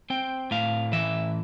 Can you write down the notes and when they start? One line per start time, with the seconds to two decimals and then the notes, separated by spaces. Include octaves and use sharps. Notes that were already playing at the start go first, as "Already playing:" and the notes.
0.10 C4 G5
0.51 A2 F5
0.93 E3 E5